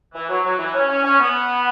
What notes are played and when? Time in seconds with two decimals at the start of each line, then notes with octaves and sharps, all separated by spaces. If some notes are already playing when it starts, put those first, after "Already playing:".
0.14 E3
0.29 F#3
0.44 F#3
0.59 E3
0.74 C#4
0.89 C#4
1.04 C#4
1.19 B3